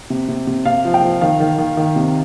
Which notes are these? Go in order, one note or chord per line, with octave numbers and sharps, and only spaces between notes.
C3
C3
C3
C3 F5
F3
G5
F3
D#3 F5
D#3
D#3
D#3
C3